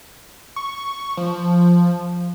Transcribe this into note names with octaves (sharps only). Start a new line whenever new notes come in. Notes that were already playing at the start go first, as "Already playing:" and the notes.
C#6
F3